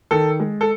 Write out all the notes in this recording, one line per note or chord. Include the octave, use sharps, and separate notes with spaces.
D#3 A4
G#3
A4